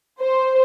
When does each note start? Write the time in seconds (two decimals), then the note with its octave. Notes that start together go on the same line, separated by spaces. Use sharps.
0.21 C5